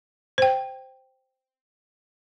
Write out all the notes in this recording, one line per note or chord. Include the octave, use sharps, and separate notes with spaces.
C5 G5